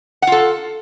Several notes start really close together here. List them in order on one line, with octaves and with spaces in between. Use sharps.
F#5 F4 A4